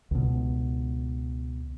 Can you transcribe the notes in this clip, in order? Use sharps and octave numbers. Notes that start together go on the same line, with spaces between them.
C#2 B2